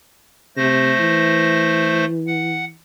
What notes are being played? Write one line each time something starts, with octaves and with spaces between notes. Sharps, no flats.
C3 A3 C5 A#6
E3
F#5